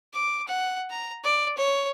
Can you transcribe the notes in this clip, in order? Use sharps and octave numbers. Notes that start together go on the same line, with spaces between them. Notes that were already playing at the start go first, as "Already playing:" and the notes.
D6
F#5
A#5
D5
C#5